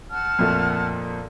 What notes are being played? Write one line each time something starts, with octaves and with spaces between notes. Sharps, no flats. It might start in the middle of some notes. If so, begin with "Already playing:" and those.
F#5 A5 F6
F2 A#2 A3